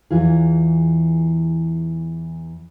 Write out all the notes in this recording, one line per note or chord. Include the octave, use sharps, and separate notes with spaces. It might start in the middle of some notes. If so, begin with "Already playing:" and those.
E2 E3 F4 G#4